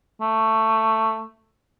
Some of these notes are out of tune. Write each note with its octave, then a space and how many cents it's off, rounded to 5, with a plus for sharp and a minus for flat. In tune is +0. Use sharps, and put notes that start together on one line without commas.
A3 +10